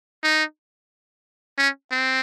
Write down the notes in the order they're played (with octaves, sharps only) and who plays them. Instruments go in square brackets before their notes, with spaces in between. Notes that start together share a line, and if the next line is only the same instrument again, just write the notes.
[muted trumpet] D#4
C#4
C4